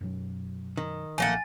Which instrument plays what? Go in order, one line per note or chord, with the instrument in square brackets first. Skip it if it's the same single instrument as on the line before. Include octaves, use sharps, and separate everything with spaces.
[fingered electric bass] F#2 B2 F#3
[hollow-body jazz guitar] D#3
[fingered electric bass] B1 A#2 F3 [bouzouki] A3 A#3 F#5 [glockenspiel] G#5 A6